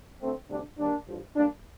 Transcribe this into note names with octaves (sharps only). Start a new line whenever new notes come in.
D2 D3 A3 C4
D2 C3 G3 D4
D#2 D#3 G3 A#3 D4
A1 G2 F3
A2 G3 A#3 D4